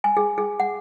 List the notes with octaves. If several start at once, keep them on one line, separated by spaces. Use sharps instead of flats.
G#5
G#4
G#4
F#5